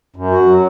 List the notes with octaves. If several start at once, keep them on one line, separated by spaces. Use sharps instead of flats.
F#2
F#4
F#3